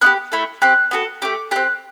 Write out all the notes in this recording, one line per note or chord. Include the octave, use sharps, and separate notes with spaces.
B3 E4 G4 F#6
A3 E4 A4
C4 G4 F#6
B3 F#4 A4
A3 D4 G4 D6
C4 G4 F#6